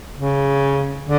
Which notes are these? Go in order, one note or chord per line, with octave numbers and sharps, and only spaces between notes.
C#3
D3